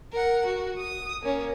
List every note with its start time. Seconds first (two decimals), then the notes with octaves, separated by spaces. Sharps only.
0.12 A#4 F#5
0.46 F#4
0.78 D#6
1.22 A#3 C#4